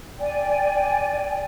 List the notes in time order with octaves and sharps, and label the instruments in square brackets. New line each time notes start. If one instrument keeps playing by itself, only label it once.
[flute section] D5 G5 G#5